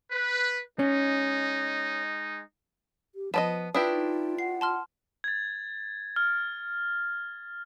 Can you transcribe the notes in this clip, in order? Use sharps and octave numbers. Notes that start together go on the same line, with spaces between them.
B4
G#3 C#4 D#4
G4
F3 B3 D5 D#5 A5
D4 E4 F4 G4 B4 D#6
D#4
F#5 C7
A5 C6 F6
G#6 A6
F6